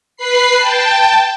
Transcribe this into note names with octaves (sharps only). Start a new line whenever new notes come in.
B4 B5 C7
G5 A5